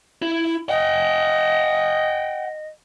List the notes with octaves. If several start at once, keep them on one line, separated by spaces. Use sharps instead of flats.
E4
D#5 F#5 G5